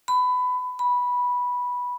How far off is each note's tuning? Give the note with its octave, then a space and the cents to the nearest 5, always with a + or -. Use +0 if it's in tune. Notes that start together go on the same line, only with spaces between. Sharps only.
B5 +20
B5 -10